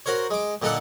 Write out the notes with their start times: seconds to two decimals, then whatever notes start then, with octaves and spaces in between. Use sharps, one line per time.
0.06 F#4 A#4 C5 C#5
0.31 G#3 D6
0.62 A#2 D3 D#4 A4 F#5